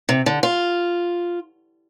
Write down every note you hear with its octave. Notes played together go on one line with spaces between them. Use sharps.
C3
D3
F4